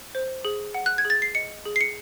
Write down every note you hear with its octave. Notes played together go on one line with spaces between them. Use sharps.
C5
G#4
F#5
F#6
G#6
G#4
A6
C7
D#5 C#7
G#4
C7
C#7